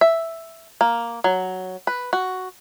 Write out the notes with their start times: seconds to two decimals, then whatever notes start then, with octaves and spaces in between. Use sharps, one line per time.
0.01 E5
0.81 A#3
1.24 F#3
1.87 B4
2.13 F#4